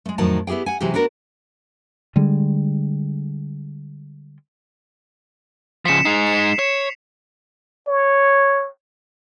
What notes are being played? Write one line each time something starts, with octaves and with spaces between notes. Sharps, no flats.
G#3 A3
F2 A2 D#3 F#3 D#4 A5
B3 E4 G4 G#4 G5
F#5 G#5
C3 E3 F#3 G#3 C#4 G4
B3 D4 F#4 A#4
D3 G3 G#3
C#3 F3 B6 C#7 E7
G#3 D#4 C7 F7
C#7
C#5 E7
C#5